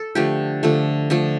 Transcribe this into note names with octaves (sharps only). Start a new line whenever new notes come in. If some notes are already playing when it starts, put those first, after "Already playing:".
Already playing: A4
D3 F3 A3 G4
D3 F3 A3
D3 F3 A3